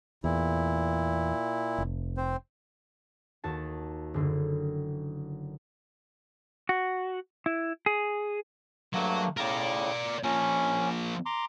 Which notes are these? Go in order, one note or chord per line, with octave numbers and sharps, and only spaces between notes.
E2 A#2 E4
F1
C4 C5
D#2 F#4 A5
F#1 D3
F#4
E4
G#4
G2 F#3 A3 A#3
A2 C#3 A#4 D5
F3 A#3 C#4
A#5 C6 D6